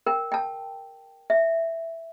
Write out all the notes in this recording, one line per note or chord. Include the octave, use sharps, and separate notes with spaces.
A#4 G5
G5 A5
E5